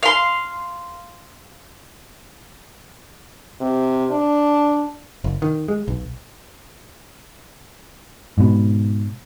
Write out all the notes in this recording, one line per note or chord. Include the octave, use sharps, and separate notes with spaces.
F5 C6
C3
D4
F#1
D#3
G#3
B1
G#2 B2